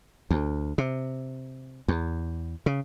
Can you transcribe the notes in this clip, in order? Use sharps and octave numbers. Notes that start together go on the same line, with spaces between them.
D2
C3
E2
C#3